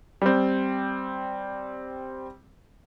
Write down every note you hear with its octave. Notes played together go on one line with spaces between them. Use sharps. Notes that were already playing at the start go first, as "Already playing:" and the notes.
G3 C4